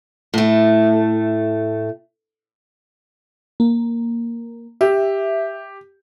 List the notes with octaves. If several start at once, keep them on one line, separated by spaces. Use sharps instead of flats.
A2 A3
A#3
G4 E5